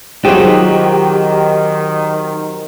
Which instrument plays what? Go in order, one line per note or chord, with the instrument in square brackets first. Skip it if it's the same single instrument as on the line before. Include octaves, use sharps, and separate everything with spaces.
[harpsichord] C3 F#3 [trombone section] D#3 [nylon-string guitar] D#4 F4 G#4 [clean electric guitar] G4